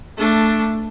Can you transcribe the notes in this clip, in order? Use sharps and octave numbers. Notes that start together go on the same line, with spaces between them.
A3 D4